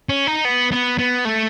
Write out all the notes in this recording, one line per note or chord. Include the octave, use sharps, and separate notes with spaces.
C#4
D#4
B3
B3
B3
A3